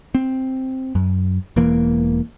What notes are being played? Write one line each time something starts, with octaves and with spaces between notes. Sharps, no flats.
C4
F#2
E1 E3 A#3